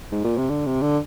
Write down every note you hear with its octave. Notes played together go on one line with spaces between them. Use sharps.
G#2
A#2
C3
D3
C3
D3